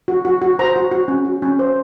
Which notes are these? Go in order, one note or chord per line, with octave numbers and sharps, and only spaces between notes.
F#4
F#4
F#4
C5 A#5
F#4
F#4
C#4
F#4
C#4
C5